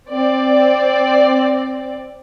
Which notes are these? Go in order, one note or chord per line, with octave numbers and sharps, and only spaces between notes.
C4 D5